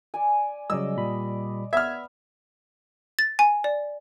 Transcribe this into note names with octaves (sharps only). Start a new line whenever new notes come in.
D5 G#5
C#3 F#3 G3 D5 D#5 E6
A#2 G3 B5
B3 E5 F6 G#6
A6
G#5
D5